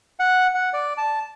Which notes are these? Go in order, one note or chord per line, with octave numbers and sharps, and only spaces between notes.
F#5
F#5
D5
A5